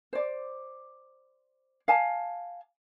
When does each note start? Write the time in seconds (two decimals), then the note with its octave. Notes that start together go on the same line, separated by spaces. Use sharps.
0.13 C5 D5
1.88 F5 G#5 A5